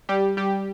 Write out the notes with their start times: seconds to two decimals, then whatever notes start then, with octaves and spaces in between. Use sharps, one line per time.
0.09 G3 G4
0.37 G3 G4